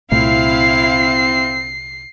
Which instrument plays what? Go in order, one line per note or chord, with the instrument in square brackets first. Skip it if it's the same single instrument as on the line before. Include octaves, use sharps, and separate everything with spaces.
[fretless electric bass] C2 A#2 A3 [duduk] C4 [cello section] E4 F5 [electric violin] C7